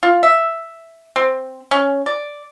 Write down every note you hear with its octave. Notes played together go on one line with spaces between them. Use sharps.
F4
E5
C4
C#4
D5